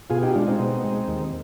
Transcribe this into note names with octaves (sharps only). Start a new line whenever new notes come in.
B2 F4 G#4
D#4 G4
G#3 D4 F4
C4 D#4
B2
G#3
D#2